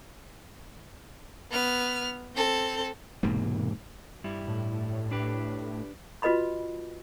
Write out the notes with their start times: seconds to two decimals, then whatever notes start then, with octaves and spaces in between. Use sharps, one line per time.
1.51 B3 F6
2.35 C4 A4
3.23 E1 G#2 C3 A#3
4.24 G2 G3 E4
4.48 A2
5.11 D4 G4 B4
6.22 F4 F#4 B4 D#5 B5 C6